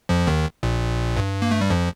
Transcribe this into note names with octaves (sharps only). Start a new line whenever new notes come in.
F2 F3
D#2 D#3
A#1 A#2
G2
A#3
A3
G3
F2 F3